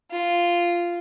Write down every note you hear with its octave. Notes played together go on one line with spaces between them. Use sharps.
F4